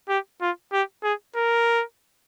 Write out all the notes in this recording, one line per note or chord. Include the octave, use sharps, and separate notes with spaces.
G4
F4
G4
G#4
A#4